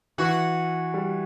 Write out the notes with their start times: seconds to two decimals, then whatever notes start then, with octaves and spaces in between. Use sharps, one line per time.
0.18 E3 F#4
0.94 G3